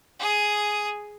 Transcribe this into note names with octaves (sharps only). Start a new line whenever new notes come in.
G#4 D#6